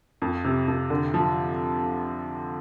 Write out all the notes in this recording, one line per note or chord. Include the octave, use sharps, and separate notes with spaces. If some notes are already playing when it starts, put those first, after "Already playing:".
F2
C3
F2
D3
F3